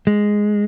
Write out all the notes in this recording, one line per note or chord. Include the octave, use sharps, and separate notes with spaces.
G#3